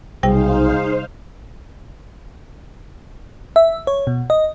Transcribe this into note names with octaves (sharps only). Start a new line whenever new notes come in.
B1 C3 G3 D#4 G#4 C5 F5 G5
E5
C#5
B2
D#5